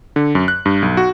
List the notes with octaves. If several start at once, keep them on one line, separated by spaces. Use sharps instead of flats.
D3
F#2
F#6
G2
B1
F#4